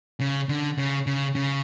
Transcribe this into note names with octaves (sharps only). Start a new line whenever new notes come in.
C#3
D3
C#3
C#3
C#3